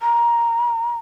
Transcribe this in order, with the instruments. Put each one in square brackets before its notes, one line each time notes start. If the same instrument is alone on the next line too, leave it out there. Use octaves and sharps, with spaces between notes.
[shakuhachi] A#5